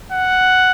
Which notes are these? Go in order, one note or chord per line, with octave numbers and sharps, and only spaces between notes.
F#5